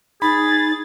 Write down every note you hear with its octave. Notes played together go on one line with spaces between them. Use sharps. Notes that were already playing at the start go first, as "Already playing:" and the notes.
D#4 G#4 B5 A6